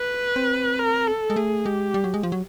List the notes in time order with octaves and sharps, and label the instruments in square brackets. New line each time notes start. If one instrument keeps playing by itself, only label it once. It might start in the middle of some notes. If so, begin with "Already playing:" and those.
Already playing: [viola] B4
[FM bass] C4
[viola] A#4
A4
[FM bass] G#3
[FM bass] A3 [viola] G#4
[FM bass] G#3 [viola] G4
[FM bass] G3
F#3
G#3
F3
F#3